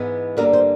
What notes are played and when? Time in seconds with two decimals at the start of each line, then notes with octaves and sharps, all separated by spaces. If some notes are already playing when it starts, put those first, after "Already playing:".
Already playing: G#2 E3 G#3 B3
0.37 G2 D3 G3 A#3 A#4
0.53 C5